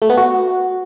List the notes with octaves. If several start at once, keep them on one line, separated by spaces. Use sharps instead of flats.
A3
B3
F#4